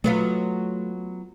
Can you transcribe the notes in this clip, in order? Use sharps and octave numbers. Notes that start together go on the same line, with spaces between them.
F#3 A3 B3 F4